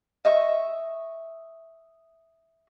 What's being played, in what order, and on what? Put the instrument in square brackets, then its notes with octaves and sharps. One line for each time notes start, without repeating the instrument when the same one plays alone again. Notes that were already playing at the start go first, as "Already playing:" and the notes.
[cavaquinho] D#5 E5 C#6